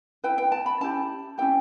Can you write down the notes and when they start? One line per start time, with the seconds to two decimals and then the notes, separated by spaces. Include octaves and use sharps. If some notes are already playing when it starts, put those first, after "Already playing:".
0.24 E4 B4 G5
0.38 G5
0.52 A5
0.66 B5
0.81 C#4 E4 G4 A5
1.38 C#4 E4 G4 G5